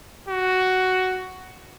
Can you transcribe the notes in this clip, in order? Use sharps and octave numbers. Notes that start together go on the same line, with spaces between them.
F#4